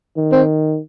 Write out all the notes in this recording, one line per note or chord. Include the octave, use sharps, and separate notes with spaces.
D#3
C4